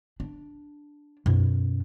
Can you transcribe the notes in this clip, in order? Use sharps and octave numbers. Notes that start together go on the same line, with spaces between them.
D4
F#2 B2